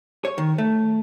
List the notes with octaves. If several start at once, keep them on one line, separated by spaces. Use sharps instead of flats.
C#5
D#3
A3